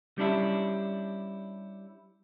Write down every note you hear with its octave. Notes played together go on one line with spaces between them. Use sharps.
G3 C#4 D4 E4